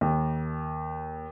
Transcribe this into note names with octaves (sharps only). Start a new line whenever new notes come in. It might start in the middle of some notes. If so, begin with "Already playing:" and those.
D#2